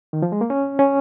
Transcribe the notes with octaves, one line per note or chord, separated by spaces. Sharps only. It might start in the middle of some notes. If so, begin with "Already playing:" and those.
D#3
F3
G#3
A#3
C#4
C#4